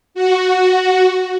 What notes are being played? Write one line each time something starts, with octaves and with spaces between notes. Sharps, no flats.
F#4